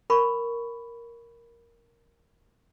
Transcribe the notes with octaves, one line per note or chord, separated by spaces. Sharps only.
A#4 B5 C#6